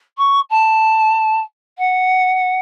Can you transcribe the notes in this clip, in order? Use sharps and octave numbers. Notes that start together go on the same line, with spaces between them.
C#6
A5
F#5